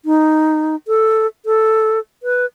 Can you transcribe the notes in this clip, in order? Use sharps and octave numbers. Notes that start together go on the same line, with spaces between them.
D#4
A4
A4
B4